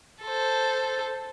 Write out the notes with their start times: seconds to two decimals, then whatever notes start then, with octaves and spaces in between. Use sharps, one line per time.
0.23 A4 C5